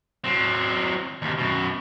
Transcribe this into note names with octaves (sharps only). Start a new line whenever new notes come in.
F#3 C4
D#2 C3
F#2 B2